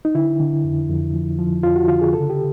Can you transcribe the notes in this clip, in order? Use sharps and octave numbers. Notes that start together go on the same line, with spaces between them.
D#4
D3 E4
D3
F2
F2
F3
F3
F2 F4
F#4
D3 F4
G#4
C#3 A4
G4